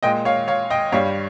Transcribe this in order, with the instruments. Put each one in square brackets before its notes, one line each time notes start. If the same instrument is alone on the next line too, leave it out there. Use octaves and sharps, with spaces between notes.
[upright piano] A#2 G#3 D#5 G5
C#5 F5
C#5 F5
D#5 G5
G2 G3 C#5 F5